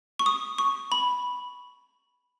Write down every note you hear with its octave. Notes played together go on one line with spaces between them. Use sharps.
C#6
D#6
C#6
B5